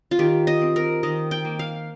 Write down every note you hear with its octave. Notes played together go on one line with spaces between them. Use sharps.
F4
D#3 G4
D#5
C4
A#4
D#3 D#5
G5
A#3
F5